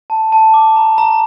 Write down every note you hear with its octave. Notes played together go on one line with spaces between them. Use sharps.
A5
A5
D6
A#5
A#5